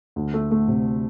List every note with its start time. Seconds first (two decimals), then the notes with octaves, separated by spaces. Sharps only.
0.16 D2
0.34 A3
0.51 A3
0.68 C3